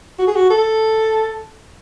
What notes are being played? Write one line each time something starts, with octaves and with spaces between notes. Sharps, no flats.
F#4
G#4
F#4
A4